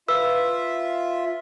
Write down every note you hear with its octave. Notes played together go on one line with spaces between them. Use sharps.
F4 B4 E5 E6